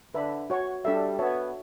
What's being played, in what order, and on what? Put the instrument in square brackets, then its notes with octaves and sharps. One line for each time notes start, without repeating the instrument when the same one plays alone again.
[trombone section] D3 [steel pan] B4 E5 B5
[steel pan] F#4 C#5 F#5 C#6
[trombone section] G3 [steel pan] D4 A4 E5
[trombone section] B3 [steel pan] F#4 C#5 E5 A5